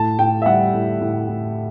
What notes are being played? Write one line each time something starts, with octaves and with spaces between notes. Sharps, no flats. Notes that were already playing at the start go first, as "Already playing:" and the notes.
Already playing: A2 A5
A2 G5
E5
G3 F#5
A2
A2
A2